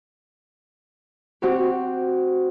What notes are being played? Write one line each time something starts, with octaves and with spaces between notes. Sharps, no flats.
C4 F#4 G4